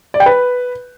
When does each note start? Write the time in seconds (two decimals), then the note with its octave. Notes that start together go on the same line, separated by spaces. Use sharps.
0.14 D5
0.20 G5
0.26 B4